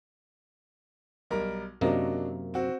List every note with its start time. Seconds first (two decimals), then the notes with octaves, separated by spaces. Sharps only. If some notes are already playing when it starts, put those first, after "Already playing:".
1.31 B1 G3 A#4
1.81 F#2 C3 F#3 A#3 D4 D#5
2.54 C4 F#4